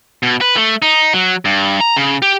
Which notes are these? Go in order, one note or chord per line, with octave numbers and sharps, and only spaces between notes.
B2
B4
A3
D#4
F#3
G2
A#5
C#3
G4